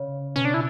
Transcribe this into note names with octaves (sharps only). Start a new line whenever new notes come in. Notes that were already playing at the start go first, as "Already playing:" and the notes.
Already playing: C#3
B2 C#4
D4
E4